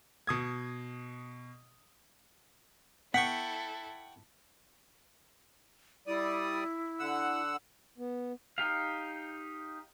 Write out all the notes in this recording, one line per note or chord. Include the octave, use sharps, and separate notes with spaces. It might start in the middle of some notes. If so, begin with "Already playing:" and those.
B2 D#6 G#6
B3 E4 A4 F#5 G5 C#6 B6
G3 E4 D5 D#6
D3 F#5 E6
B3
D#4 G4 F5